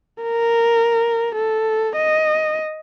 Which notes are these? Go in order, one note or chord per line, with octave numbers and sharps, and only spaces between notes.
A#4
A4
D#5